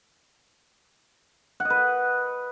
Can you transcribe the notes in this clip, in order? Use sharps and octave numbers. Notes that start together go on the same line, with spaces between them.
F#5
D#5
B4